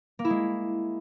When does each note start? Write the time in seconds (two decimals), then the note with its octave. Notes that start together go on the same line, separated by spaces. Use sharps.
0.19 A#3
0.25 E4
0.30 G#3